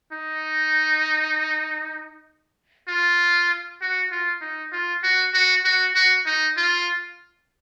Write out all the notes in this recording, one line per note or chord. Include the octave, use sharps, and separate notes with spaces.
D#4
F4
F#4
F4
D#4
F4
F#4
F#4
F#4
F#4
D#4
F4